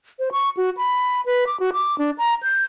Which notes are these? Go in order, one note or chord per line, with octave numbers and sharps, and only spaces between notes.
C5
C#6
F#4
B5
B4
D6
F#4
D6
D4
A#5
G6